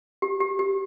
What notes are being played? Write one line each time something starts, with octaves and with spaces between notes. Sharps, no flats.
G4
G4
G4